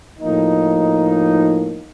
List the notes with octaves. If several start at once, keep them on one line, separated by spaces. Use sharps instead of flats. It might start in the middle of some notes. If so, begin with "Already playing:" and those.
A2 F3 A#3 D#4